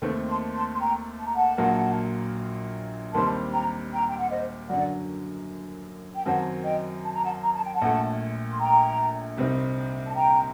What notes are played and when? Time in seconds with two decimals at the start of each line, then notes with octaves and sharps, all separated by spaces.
0.02 D#2 D#3 A3 C4
0.28 A5 C6
0.54 A5 C6
0.74 C6
0.80 G5 A#5
1.19 A5
1.27 A#5
1.35 F#5 A5
1.58 A#1 A#2 F#3 A#3
3.13 D#2 D#3 G3 C4 A5 C6
3.52 G5 A#5
3.91 G5 A#5
4.07 G5
4.18 F#5
4.30 C5 D#5
4.70 F#2 D3 F#3 D5 F#5
6.16 G5
6.25 F#2 D#3 F#3 C4 F#5 A5
6.64 D#5 G5
7.03 A5
7.14 A#5
7.24 F#5 A5
7.42 A#5
7.53 A5
7.64 G5
7.74 F#5 A5
7.82 A#1 A#2 A3
8.53 C6
8.59 G5 A#5
9.37 C2 C3 G3 C4 D#4
10.07 A5
10.15 G5 A#5